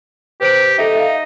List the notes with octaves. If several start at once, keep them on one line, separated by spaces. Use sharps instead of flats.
G4 B4 C5 D7
D#4 A4 E5
E5 F5